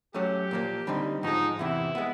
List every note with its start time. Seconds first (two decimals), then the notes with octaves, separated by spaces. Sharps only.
0.14 F#3 A3 C#4 G4
0.51 A#2 F3 A#3
0.87 D3 G3 C4 D#4
1.23 G#2 F3 G#3 D#4
1.59 E2 C3 E3 E4
1.95 G#3 B3